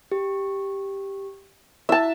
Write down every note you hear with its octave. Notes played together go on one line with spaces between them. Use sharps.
G4
E4 E5 A5